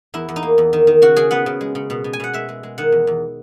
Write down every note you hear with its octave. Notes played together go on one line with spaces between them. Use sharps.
E2 E4
E2
D#4
A#3
E2
D#3
D#3
C#3 F#4
C#3 G#4
B3 F#5
C#3
G#3
C#3
B2
B2
G#5
B2 F#5
G#3 E5
G#3
G#3
D#3 F#5
E2
E2